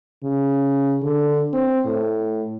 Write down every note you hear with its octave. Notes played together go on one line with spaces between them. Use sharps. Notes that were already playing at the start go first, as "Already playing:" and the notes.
C#3
D3
C4
A2